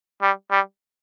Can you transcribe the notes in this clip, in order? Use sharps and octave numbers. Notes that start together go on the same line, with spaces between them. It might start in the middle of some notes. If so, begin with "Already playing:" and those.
G3
G3